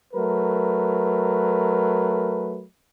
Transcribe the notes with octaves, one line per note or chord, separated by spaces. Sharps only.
F#3 A3 A#4 B4